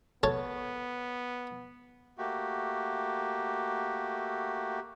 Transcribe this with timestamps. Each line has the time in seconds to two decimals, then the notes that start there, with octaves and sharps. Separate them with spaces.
0.23 B3 A4 C#5
2.18 A3 A#3 F#4 G4